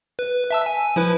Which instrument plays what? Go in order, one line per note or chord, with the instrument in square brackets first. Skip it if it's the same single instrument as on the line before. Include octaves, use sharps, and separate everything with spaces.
[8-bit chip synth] B4
E5 A5 E6
G#5
F3 E4 B4